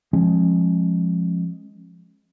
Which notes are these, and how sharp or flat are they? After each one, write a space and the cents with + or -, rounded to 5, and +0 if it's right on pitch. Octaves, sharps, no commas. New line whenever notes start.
F3 +0 G#3 +0 C#4 -45